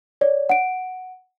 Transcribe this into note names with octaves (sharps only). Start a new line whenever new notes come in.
C#5 D5
F#5 D7